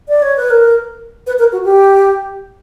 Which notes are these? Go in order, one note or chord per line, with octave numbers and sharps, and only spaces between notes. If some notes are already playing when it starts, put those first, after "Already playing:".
D5
C#5
B4
A#4
B4
A#4
F#4
G4